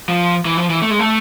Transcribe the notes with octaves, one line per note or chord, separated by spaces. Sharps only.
F3
E3
F3
E3
A3
G#3
A3